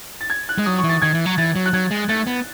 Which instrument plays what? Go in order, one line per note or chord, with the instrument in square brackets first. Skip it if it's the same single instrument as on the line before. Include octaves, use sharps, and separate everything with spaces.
[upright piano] A6
G#6
F#6
[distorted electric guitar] G#3
[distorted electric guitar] F#3 [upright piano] D#6
[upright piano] C#6
[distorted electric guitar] E3
[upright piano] A6
[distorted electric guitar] D#3 [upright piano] G#6
[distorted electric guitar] E3
F#3
[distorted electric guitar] E3 [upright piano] A6
[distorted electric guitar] F#3
[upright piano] F#6
[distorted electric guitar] F#3 [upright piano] G#6
[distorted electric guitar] G#3
[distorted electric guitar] A3 [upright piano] A6
[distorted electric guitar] B3